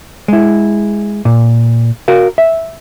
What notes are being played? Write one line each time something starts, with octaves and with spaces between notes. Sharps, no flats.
G#3 E4
A#2
F#4 A#4 F5
E5